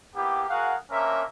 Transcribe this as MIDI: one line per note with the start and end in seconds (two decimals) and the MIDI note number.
0.15 0.44 58
0.15 0.44 59
0.15 0.44 64
0.15 0.44 67
0.50 0.75 66
0.50 0.75 68
0.50 0.75 70
0.50 0.75 77
0.50 0.75 78
0.90 1.23 58
0.90 1.23 61
0.90 1.23 62
0.90 1.23 70
0.90 1.23 72
0.90 1.23 76